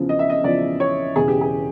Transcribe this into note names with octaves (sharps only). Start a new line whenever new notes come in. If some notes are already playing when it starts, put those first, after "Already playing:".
Already playing: E2 C#3 F3
D#5
E5
D#5
E2 C#3 F3 D5
C#5
E1 E2 C#3 G#4
G4
G#4